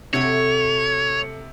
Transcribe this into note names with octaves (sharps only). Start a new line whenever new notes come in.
C3 A3 F#4 A4 C#5